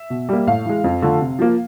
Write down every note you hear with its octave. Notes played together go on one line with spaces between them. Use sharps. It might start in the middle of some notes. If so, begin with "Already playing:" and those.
Already playing: E5
B2
G3 A#3
A2 F5
E3 G#3
F2
D3 F3 A3
C3
F3 A#3